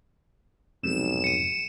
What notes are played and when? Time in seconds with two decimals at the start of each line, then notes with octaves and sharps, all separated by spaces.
0.83 B1 F2 G#2 C3 E7
1.24 C#7 D#7